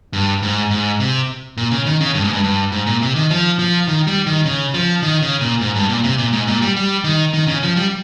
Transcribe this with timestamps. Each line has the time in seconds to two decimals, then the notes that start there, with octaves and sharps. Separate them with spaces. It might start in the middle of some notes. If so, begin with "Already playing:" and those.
0.13 G2
0.42 G#2
0.71 G#2
1.00 C3
1.57 A#2
1.71 C#3
1.86 D#3
2.01 C#3
2.15 G2
2.24 G#2
2.33 G2
2.44 G2
2.72 G#2
2.86 A#2
3.02 C3
3.16 D#3
3.31 F3
3.59 F3
3.88 D#3
4.07 G3
4.27 D#3
4.45 C#3
4.74 F3
5.03 D#3
5.22 C#3
5.41 A#2
5.61 G#2
5.76 G2
5.89 A#2
6.04 C3
6.18 A#2
6.33 G#2
6.47 A#2
6.62 G3
6.77 G3
7.04 D#3
7.34 D#3
7.47 C#3
7.63 F3
7.76 G3